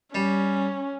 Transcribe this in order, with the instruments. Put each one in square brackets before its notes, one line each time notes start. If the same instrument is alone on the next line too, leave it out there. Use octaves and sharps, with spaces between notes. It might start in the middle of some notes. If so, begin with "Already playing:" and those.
[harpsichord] G3 [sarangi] C#4